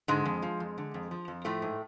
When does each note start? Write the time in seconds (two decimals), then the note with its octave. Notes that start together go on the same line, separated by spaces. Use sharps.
0.08 G#2 D3 G#3
0.25 F2
0.42 F3
0.60 F2
0.78 D3
0.94 F2
1.11 F3
1.28 F2
1.44 A2 F3 A3
1.62 G#2